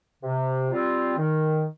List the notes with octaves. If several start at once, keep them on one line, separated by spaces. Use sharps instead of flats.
C3
G3 C4 F4
D#3